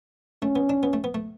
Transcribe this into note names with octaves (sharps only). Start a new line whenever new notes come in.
A3 C#4
B3
D4
B3
A3
B3
A3